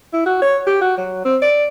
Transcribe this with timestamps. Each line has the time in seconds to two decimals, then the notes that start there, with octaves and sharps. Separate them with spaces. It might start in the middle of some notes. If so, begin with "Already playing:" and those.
0.13 E4
0.26 F#4
0.42 C#5
0.67 G4
0.82 F#4
0.98 F#3
1.25 C4
1.42 D5